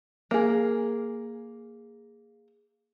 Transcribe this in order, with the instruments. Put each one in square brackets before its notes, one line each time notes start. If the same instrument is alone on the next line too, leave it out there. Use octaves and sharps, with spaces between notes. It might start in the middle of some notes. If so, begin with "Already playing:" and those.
[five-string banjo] A#3 G#4